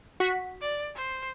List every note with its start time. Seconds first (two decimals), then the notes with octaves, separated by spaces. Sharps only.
0.20 F#4 B6
0.61 D5
0.95 C5